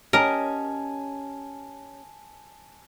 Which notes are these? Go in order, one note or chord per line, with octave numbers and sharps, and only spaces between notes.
C#4 G4 A#4 D#5 G#5 A5